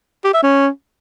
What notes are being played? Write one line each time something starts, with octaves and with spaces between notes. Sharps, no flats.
G4
E5
C#4